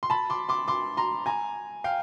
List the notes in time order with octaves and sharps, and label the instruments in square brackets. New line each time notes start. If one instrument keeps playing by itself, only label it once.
[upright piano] C6
A5 B5
C6 D6
C6 D6
C6 D6
A#5 C6
G#5 A#5
F5 G5